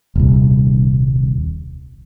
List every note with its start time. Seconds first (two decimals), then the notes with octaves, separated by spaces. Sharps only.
0.15 D#1 C2